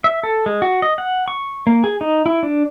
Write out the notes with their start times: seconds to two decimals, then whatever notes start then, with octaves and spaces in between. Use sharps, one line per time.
0.04 E5
0.23 A4
0.46 G#3
0.62 F#4
0.82 D#5
0.98 F#5
1.28 C#6
1.67 A#3
1.84 G#4
2.01 D#4
2.26 E4
2.43 D4